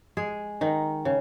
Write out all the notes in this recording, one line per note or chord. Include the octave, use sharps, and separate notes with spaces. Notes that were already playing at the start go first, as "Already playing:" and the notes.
G#3 G#4
D#3 D#4
C#3